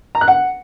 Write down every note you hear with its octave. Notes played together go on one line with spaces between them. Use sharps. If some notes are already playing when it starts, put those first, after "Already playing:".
A#5
F#6
F#5